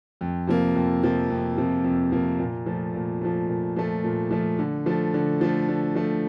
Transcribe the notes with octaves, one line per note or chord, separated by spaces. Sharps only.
F2
C3 F3 A#3
F2
C3 F3 A#3
F2
C3 F3 A#3
F2
C3 F3 A#3
A#2
F3 A3
A#2
F3 A3
A#2
F3 A3
A#2
F3 A3
D3
F3 A3
D3
F3 A3
D3
F3 A3